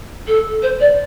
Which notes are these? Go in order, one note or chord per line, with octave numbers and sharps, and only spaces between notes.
A4
C5
D5